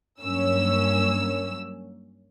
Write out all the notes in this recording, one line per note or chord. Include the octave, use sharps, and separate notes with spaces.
G2 F#3 A#3 C#4 E6